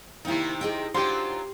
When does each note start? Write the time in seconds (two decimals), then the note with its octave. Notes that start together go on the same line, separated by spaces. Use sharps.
0.25 C3 D#3 A#3 D#4 E4
0.61 G#4 D#5 G5
0.94 F#3 D4 F4 G4 C5 G5 C6